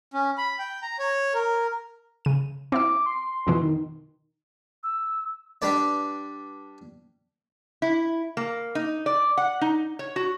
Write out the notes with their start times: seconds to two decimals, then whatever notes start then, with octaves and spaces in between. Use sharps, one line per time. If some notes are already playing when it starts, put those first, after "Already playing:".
0.13 C#4
0.38 B5
0.59 G5
0.82 A#5
0.99 C#5
1.34 A#4
2.25 C#3 D#7
2.72 C4 E4 D6 E6
3.06 C6
3.47 F2 B2 E3
3.62 D#3
4.84 E6
5.62 G3 D4 B4 D5
7.82 E4
8.37 A#3
8.75 D#4
9.06 D5
9.37 F#5
9.61 D#4
9.99 C#5
10.16 F#4